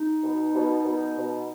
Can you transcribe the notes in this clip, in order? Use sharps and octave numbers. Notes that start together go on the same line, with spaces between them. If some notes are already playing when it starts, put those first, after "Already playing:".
Already playing: D#4
B2
B2
B2
B2